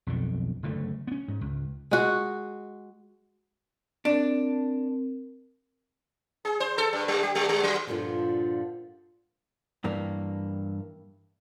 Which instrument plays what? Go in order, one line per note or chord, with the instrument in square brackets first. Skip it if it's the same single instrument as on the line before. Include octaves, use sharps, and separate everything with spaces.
[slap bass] B1 F2 D3
F#1 D3 A3
B3 C#4
G#2
C#2
[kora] G#3 F#4
[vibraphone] C4 A#4 [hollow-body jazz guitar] D4
[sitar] G#4
C5
A4
G2
G3
G4
G3
G3
F#3
[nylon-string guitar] G2 A#2 D3 F3 D4 F4
[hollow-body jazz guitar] G2 E3 A#3